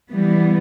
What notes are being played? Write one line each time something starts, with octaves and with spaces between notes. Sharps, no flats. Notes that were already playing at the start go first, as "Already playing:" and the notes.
E3 G3 B3